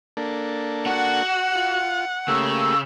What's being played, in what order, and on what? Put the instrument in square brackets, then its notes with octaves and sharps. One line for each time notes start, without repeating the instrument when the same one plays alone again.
[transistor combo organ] A#3 D4 A4
[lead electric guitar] F#4 [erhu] F#5
[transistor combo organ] F4
[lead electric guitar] C#3 [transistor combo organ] A3 A#3 G4 [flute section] C#6 E6